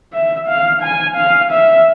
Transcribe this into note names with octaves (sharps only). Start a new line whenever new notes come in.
E5
F5
G#5
F5
E5